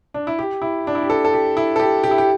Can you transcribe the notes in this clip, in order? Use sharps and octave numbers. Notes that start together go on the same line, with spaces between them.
D4
E4
G4
E4
D4
E4
G4
A4
A4
G4
E4
A4
G4
G4
E4
G4